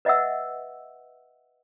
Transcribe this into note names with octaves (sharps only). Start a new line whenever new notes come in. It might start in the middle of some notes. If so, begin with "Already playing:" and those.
B4 D#5 E5 F#5 E6